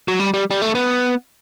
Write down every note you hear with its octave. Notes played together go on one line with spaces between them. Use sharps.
F#3
G3
G3
G3
A3
B3